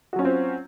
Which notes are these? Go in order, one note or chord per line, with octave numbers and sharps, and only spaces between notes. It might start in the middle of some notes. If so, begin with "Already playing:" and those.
F#3 C4 C#4 F4 F#4